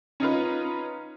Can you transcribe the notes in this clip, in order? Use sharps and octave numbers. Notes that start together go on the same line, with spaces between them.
C#4 D#4 F4 B4